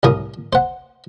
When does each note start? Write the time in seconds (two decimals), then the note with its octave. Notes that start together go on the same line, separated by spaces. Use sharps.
0.03 C2 A2 A#4 D#6
0.53 C5 F#5